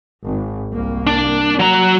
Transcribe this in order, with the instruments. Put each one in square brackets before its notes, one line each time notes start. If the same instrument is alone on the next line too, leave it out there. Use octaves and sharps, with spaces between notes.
[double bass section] G#1
C2 A#3
[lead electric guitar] D4
F#3 A#5